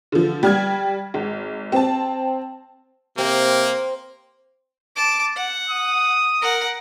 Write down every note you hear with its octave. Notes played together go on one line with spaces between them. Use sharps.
D3 F3
G3 F6 G#6
G#1
C4 A5
C3 A#3 C4
A5 D6
F#5
D#6
A#4 F#5